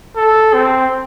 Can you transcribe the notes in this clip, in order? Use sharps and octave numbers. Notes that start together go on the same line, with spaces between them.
A4
C4